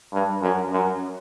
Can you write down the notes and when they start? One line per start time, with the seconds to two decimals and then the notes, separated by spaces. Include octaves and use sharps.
0.13 G2
0.42 F#2
0.72 F#2